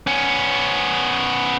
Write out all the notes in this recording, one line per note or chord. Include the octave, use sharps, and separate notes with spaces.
B3 C#4